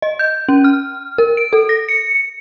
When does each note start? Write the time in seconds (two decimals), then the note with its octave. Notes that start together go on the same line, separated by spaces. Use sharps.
0.02 D#5
0.19 G6
0.49 C#4
0.64 F6
1.18 A#4
1.37 D7
1.53 A4
1.69 A#6
1.89 C#7